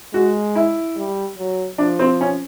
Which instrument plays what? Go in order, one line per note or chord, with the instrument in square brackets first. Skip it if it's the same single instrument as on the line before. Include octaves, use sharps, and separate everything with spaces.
[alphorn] G#3 [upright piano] F#4
[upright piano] E4
[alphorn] G3
F#3
[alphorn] F3 [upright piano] D4
[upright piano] C4
C#4